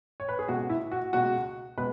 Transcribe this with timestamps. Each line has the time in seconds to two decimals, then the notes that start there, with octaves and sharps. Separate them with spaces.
0.20 C#5
0.29 B4
0.39 G#4
0.48 C#2 B2 G#3 F#4
0.70 E4
0.92 F#4
1.13 C#2 B2 G#3 F#4
1.78 B2 G#3 B4